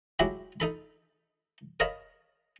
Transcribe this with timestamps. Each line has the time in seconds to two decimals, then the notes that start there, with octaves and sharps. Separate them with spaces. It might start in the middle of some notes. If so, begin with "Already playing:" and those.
0.19 F#3 G#3 E4 F#4 G4
0.60 D#4 A4 B5
1.80 A#4 C#5 D#5 F5 A5 B5